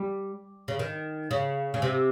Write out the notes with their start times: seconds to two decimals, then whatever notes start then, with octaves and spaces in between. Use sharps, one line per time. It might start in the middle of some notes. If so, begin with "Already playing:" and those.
Already playing: G3
0.68 C#3
0.79 D#3
1.31 C#3
1.74 C#3
1.82 C3